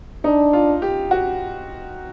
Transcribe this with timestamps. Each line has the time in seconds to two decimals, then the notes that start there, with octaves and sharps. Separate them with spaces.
0.24 D4 D#4
0.53 F4
0.82 G4
1.11 F#4